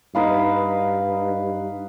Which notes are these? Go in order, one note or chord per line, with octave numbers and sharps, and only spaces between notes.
G2 D#4 B4 F5